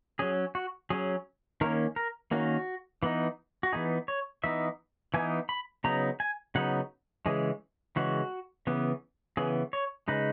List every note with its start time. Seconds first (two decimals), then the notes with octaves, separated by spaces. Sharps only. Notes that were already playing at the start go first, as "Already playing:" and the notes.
0.19 F#3 C#4 G#4
0.55 F#4
0.90 F#3 C#4 G#4
1.61 D#3 A#3 C#4 A#4
1.96 A#4
2.31 D#3 A#3 C#4 F#4
3.03 E3 B3 D#4
3.63 F#4
3.72 E3 B3 D#4 G#4
4.08 C#5
4.44 E3 B3 D#4 E5
5.14 E3 B3 D#4 G#5
5.49 B5
5.84 C#3 F#3 B3 D#4 A#5
6.20 G#5
6.55 C#3 F#3 B3 D#4 F#5
7.26 C#3 E3 G#3 G#4
7.96 C#3 E3 G#3 F#4
8.67 C#3 E3 B3
9.37 C#3 E3 B3 G#4
9.73 C#5
10.08 C#3 G#3 D#4 B4